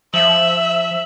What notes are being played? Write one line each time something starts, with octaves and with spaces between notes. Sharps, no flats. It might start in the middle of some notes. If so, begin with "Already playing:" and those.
F3 E5 F#7